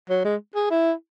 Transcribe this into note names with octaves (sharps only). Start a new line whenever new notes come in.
F#3
G#3
G#4
E4